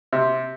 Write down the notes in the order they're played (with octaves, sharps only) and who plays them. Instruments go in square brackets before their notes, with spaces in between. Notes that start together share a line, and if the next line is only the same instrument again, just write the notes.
[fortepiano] C3